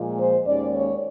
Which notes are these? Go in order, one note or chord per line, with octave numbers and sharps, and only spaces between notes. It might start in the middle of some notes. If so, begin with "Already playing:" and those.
Already playing: A#2 F3 G#3
C5
D#2 D#3 G#3 C#4 D5
C#5